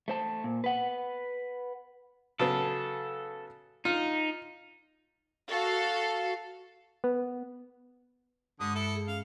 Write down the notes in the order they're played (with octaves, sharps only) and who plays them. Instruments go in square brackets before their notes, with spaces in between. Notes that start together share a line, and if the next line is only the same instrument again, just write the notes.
[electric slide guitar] A3 C5 A5
A#2
B4 F#5
[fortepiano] C#3 F#3 B3 [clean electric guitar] A4
[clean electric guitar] D#4 [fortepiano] F4
[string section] F#4 A4 F5
[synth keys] B3
[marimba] G2 G#3 [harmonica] D3 D#6
[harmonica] E4 A4
[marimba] G#4
[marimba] C#4 [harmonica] F5